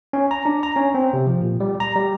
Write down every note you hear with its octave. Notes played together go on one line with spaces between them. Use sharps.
C#4
A#5
D4
A#5
C#4
C4
C3
F3
A#2
G3
A#5
G3